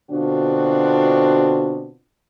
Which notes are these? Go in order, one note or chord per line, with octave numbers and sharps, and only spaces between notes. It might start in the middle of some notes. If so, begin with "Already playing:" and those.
B2 D3 C4 D4 F4 F#4